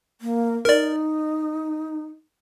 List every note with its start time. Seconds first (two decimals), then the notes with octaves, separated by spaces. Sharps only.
0.21 A#3
0.65 D#4 A#4 D5